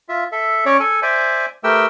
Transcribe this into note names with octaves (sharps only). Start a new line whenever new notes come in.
F4 E5
A4 E5
C#4 C#5 D5
A4 G#5
C5 D5 E5 G#5
A3 G4 A#4 B4 G5 E6